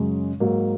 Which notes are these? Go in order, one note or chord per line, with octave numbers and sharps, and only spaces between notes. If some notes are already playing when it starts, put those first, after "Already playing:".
Already playing: F#2 C#3 G#3
G#2 F#3 A#3